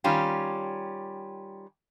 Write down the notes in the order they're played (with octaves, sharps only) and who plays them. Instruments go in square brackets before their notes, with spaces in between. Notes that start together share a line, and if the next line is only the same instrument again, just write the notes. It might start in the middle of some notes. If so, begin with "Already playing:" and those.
[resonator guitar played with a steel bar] D#3 G3 C#4 F4 G4